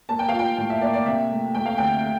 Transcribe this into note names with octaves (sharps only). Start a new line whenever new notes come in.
A#3 A5
G5
F4 F5
G5
A2 G5
E5
A#3 D5
D5
C3 E5
A3
A3 G5
F5
D2 G5
A3